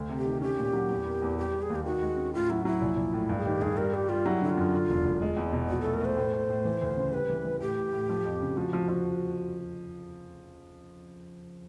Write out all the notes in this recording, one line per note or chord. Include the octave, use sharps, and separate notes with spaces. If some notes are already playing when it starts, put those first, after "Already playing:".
Already playing: D2
C3
G4
D#3
C#4 G4
A#2
F#3
E2
A#3
E2
G3 G4
G3
G#4
D#2
G4
D#3 F#4
G#3
C#4
A2 F4
F#3 E4
F#3 E4
A#1
A#1
A2
G2
G#4
D#3 G4
G2 G#4
G3 A#4
G3 G4
G3 F4
F#3 E4
D3 E4
F4
F#2
D3
E1
E1
G#3
E2
B2
A#1 F#4
A4
A3
A#4
A3 C5
A2
A2
A2
E3
D2
C#3
G3 B4
E3
E3
A2 G4
A2
A2
F3
F2
C#3
F3 F#4
F3
F3